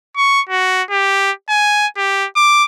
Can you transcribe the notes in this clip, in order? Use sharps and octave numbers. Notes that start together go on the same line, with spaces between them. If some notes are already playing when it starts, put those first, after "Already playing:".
C#6
F#4
G4
G#5
G4
D6